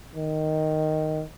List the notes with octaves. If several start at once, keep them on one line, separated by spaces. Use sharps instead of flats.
D#3